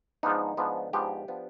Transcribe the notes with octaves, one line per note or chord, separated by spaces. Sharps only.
G#2 F3 B3 D4 D#4
G#2 F3 B3 D4
G#2 F3 B3 D4 G4
F3 B3 D4